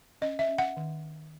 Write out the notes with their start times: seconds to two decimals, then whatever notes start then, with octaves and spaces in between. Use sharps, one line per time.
0.22 C#4 D#5
0.39 E5
0.49 C#4
0.58 F#5
0.77 D#3